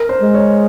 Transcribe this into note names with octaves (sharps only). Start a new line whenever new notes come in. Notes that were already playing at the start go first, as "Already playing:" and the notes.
Already playing: A#4
C5
G#3
C#5